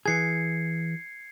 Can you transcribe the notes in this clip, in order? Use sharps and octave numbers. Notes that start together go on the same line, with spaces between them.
E3 G#4 G#6 C7 C#7